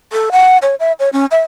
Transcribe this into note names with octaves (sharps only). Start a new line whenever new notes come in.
A4
F#5
C#5
E5
C#5
C#4
E5